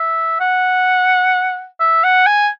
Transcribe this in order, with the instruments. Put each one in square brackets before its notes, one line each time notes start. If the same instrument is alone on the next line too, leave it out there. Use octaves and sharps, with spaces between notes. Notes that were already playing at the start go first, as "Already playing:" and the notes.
Already playing: [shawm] E5
F#5
E5
F#5
G#5